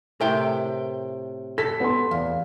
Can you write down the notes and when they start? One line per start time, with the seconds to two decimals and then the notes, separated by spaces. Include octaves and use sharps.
0.21 A2 C3 A#4 G5
1.58 A4 B6
1.80 B3 C6
2.11 E2 F5